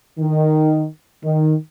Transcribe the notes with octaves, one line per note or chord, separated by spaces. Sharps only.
D#3
D#3